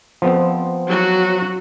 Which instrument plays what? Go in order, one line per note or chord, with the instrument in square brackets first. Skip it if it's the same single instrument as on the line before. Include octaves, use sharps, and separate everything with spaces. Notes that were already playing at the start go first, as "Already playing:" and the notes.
[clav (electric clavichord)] F3 B3 C4
[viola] F#3 F#4